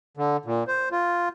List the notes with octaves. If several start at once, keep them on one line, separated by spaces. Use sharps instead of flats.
D3
A#2
C5
F4